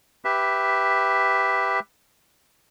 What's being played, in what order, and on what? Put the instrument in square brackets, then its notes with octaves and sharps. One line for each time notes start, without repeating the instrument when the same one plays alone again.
[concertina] G4 B4 E5